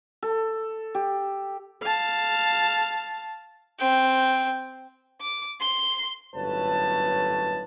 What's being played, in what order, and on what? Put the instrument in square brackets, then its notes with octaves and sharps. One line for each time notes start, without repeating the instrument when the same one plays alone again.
[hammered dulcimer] A4
G4
[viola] F5 A5
[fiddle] C4 G5
[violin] D6
C6
[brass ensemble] G1 F#2 A2 B4 C#5 A5